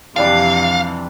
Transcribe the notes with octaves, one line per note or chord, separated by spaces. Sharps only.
F2 C3 E3 G3 D4 F5 A5